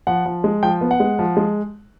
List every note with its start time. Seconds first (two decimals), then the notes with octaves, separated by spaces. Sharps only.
0.07 F3 F#5
0.26 F3
0.44 G#3
0.63 F3 G5
0.81 B3
0.91 F#5
1.00 G#3
1.19 F3
1.37 G#3